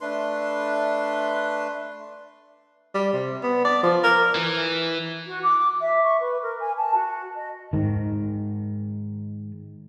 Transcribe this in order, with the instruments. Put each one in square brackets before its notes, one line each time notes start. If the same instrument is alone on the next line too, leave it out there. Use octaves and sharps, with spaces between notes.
[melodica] A3 D4 B4 C6
[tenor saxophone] G3
C3
B3
D5
F3
A#4
[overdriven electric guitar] E3
[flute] F#4
D6
E5
C#6
B4
A#4
G#5
A5
F#4
D#5
[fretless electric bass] G#2 D#3